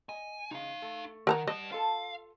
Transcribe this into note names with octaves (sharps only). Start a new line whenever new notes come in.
D#5 G#5
C#3 G#3 D#4 F5
A3
D#3 A#4 B4 F#5 A5 A#5
G3 D#5 A5
F4 A4 F5 A5